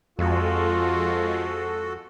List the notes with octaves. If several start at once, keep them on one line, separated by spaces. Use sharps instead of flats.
F2 F3 G#3 F4 F#4 A4